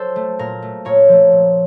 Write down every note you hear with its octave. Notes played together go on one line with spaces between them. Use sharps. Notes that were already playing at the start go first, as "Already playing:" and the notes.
Already playing: F#3 A4 C5
A3
A#2 A#4
A3
A#2 A#4 C#5
F3 A3
A#2